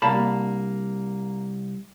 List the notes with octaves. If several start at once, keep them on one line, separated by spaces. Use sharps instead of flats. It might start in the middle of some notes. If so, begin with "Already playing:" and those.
C2 A#3 A5 B5